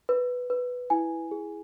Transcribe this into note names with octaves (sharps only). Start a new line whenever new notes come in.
B4
B4
E4 G#5
G#4